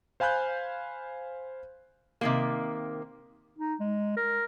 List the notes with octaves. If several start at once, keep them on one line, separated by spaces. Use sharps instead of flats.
C5 F5 G#5 B5 F#6 G6
C3 D#3 A#3
D#4
G#3
A#4